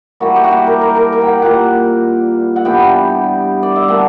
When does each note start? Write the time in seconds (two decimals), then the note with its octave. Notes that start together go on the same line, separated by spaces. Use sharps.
0.20 E3 G3 A#3 F#4
0.36 G4
0.44 F#4
0.51 G4
0.67 A#4
0.81 A#4
0.96 A#4
1.13 A#4
1.21 G5
1.27 F#5
1.42 A#2 G3 A#3 F#5
2.56 F#5
2.65 G2 E3 G3 B3 G5
3.63 D5
3.76 E5
3.88 D3 G3 A#3 F#5